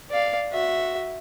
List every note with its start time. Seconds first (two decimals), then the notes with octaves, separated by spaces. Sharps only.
0.10 D5 F5
0.52 F#4 E5